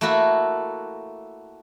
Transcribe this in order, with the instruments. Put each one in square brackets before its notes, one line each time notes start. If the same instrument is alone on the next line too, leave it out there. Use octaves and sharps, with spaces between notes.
[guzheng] A3 A#3 E4 F#4 A4